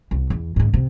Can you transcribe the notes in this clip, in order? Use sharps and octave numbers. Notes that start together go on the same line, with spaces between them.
C2
E2
G#2 C#3
C3